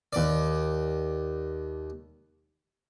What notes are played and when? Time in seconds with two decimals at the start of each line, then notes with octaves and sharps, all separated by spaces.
0.13 D#2 D5